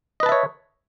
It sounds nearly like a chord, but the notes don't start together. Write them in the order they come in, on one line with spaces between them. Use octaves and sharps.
D#5 B4 A5 E5 C#5